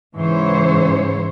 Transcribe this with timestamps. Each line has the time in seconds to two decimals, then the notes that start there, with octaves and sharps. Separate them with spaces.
0.16 G#2 C#3 E3 C#4 C5 C#5